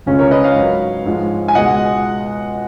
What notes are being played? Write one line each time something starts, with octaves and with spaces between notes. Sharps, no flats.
C#2 C#3 G#3 C#4 F4
A#4 C#5
B4 D#5
C#5 F5
G#2 F#3
G#2 F3 G#3
G#5
C#2 B2 G#3 D#5 F#5